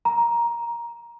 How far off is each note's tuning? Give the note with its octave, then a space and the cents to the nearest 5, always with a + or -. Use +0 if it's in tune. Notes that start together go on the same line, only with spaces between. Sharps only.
A#5 +10